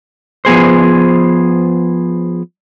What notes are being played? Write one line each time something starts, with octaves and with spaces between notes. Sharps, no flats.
F3 B3 G#4 C5